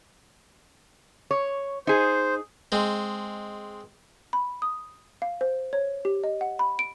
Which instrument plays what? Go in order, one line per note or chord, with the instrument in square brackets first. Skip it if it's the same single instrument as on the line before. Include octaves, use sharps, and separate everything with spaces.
[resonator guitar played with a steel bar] C#5
[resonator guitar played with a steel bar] D#4 G#4 [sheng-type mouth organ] C5
[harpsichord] G#3 C4
[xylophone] B5
D#6
F5
C5
C#5
G4
D#5
F#5
B5
D7